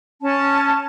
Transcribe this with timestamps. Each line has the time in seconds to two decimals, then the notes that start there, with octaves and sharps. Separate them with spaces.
0.22 C#4 A5